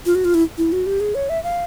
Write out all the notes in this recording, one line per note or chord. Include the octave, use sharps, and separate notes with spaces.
F4
F#4
F4
E4
E4
F#4
G4
G#4
C#5
E5
F5